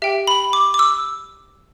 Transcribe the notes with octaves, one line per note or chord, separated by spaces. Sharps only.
G4 E5 G5
B5
D6
D6
E6